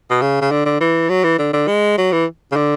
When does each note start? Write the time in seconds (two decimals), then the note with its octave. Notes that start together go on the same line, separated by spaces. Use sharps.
0.10 B2
0.22 C#3
0.41 C#3
0.51 D3
0.66 D3
0.80 E3
1.09 F#3
1.24 E3
1.39 D3
1.53 D3
1.68 G#3
1.98 F#3
2.12 E3
2.51 C#3
2.56 D3